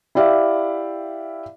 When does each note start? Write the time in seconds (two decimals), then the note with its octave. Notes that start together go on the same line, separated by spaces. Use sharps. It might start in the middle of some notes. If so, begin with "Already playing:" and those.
0.15 E4 G4 D5 E5 F5